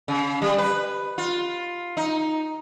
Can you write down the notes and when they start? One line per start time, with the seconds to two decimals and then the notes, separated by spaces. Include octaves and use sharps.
0.08 C#3
0.42 G3
0.58 B4
1.18 F4
1.97 D#4